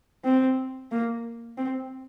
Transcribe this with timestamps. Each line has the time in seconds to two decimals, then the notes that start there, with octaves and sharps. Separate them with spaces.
0.24 C4
0.91 A#3
1.57 C4